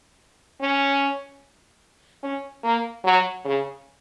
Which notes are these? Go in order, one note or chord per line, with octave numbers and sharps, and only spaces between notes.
C#4
C#4
A#3
F#3
C#3